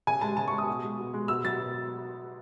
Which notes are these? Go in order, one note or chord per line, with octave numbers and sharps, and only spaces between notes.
C#3 G#5
G#3 A5
C#3 A5
G#3 C#6
D#6
B2
G#3
B2
G#3
B2 E6
F#3 A6
B2